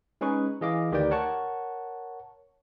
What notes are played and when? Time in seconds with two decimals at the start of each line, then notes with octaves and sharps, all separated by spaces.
0.21 G#3 C#4 D#4 G#4 B4 C#6
0.61 E3 G#4 D#5 F5 D6
0.92 D2 D#3 G4 B4 D5 G5
1.11 A#4 C#5 F#5 A5 C#6